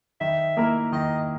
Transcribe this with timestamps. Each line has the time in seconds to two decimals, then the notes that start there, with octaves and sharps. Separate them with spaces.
0.21 D#3 E5
0.57 A#3 E4 A#4
0.92 D#3 D#5